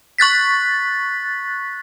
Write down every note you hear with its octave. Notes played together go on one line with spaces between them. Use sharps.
C#6 F#6 A6 B6